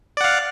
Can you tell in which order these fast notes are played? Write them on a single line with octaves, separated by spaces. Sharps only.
D5 F#5 F5